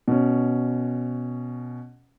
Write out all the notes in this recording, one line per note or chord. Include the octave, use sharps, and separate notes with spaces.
B2 C#4